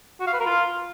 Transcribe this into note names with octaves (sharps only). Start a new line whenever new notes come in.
F#4
F5
B4
A#4
F4